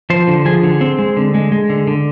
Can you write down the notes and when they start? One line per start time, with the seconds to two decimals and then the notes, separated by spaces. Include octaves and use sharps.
0.10 F3 C5
0.28 D3
0.45 F3 G#4
0.63 D3
0.81 C4
0.99 G#3
1.17 D3
1.34 G#3
1.52 G#3
1.69 D3
1.87 D3